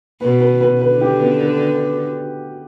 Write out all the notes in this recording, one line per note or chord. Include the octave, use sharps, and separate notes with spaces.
B2 B4
B4
B4
D3 B4
G4
B3
B4